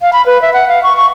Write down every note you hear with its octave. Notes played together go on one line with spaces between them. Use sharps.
F5
B5
B4
E5
F#5
F5
C#6
C#6